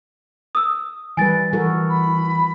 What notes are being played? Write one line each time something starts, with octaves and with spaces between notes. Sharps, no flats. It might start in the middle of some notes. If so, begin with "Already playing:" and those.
D#6 E6
E3 G3 B4 G#5 A6
E3 F#4 A4 A#4
B5